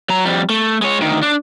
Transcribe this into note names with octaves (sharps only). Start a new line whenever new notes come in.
F#3 A#5
F2 G3
A3
G#3 C#5
D2 D#3
D4